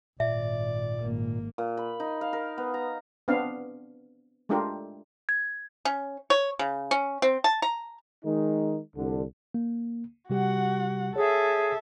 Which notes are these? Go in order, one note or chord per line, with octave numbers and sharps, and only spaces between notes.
G#1 A#2 D5 E5
G#1 A#3
A#2
B5
D#4
F5
A#4
B3
A#5
B3 C4 D4 F5
G#3 A3 D4 F4 G4 A#4
G#6
C#4
C#5
C#3
C#4
C4
A5
A#5
D#3 G#3 D#4
C2 D3
A#3
C3 G3 F#4 G4 F#5
G#4 A4 C#5 E5 G#5